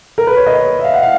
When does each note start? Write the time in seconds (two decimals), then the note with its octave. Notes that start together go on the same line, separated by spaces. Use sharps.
0.18 A#4
0.27 B4
0.37 C#5
0.46 D#5
0.79 E5
0.84 F5
0.94 F#5
1.03 F5